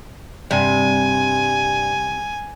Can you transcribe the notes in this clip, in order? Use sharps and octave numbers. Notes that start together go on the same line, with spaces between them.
G2 C3 G#5